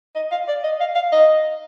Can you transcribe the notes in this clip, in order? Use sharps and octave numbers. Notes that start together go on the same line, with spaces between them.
D#5
F5
D5
D#5
F5
F5
D#5